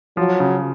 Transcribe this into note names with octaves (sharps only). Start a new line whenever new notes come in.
F3 F#3
C#3